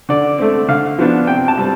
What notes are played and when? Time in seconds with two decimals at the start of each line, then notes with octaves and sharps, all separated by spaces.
0.09 D3 D5
0.38 A3 C4
0.68 D3 F5
0.98 F3 B3 D4
1.27 C3 G5
1.48 A5
1.57 G3 C4